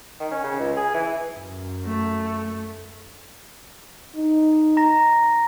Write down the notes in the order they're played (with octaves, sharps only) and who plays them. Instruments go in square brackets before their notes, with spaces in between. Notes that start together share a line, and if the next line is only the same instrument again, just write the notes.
[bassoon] D#3
C#4
C#3
C#2
G#4
E3
[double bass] F#2
[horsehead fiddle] A3
[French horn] D#4
[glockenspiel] A#5 A#6